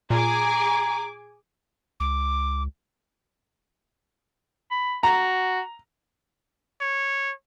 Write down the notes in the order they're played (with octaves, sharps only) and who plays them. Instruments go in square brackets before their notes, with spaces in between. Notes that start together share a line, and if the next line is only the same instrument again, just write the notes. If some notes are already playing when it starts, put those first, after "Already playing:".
[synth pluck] A#2 [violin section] G#4 G#5 D6 [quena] A#5
[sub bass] C#2 [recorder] D6
[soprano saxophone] B5
[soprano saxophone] F#4 [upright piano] A#5
[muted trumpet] C#5